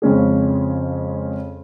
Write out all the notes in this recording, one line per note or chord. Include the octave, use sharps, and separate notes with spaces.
F2 C#3 G#3 C#4 G#4